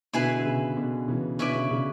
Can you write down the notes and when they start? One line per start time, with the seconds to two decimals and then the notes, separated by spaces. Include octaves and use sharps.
0.14 B2 D3 E4 G#4 B4
0.39 D3
0.46 C#3
0.76 B2 D3
1.08 C#3 E3
1.39 B2 D3 C#4 E4 B4 D5
1.55 C#3
1.71 C#3